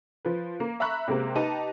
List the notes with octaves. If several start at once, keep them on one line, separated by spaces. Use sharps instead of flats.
F3 B4
A#3
E5 A#5 B5 C#6 F#6
C3 G#3 A#3 C4 G4
D#4 G4 B4 A5 D#7